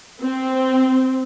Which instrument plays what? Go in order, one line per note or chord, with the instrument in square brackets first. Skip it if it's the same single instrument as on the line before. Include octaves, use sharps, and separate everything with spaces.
[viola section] C4